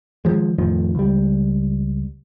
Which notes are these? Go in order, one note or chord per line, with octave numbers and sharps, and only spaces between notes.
D#3 F3 G#3
F2 A2 D#3 F3
C#2 G3